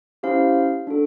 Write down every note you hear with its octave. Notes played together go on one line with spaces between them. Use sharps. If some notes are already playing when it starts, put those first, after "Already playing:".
C#4 E4 G4 C5 F5
D4 F#4 A4